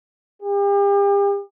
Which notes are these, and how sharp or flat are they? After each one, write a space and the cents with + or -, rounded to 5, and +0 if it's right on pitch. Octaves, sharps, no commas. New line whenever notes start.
G4 +40